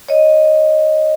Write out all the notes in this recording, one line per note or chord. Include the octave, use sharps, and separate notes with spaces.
C#5 D#5